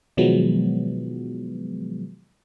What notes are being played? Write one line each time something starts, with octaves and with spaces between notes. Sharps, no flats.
B2 D#3 F3 F#3 G#3 B3